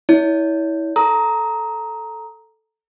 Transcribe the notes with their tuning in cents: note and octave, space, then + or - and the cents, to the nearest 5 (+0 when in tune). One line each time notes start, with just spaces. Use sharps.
E4 -25 C#5 +35
A4 +0 A#5 +0 D#6 +25